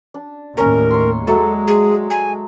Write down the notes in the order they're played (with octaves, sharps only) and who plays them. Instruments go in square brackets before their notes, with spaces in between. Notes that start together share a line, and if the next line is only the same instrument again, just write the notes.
[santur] D4
[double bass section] D#2 A2 [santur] C#4 A#5 [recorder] A#4
[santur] C#5 A#5 C6
[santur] F#3 A3 D5 [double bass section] G#3 [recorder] A4
[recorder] G#4
G#5